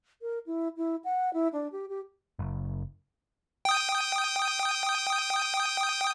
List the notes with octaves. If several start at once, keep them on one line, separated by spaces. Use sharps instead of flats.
A#4
E4
E4
F#5
E4
D4
G4
G4
F#1
G5 D#6